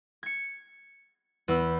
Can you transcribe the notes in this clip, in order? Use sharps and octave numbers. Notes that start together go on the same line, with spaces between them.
G#6 C#7
E2 B5 E6